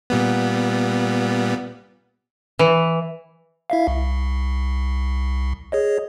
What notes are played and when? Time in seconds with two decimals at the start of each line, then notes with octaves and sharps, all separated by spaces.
0.10 A#2 G3 B3
2.59 E3
3.70 E4 E5 F5
3.88 C2
5.72 G#4 C#5 D#5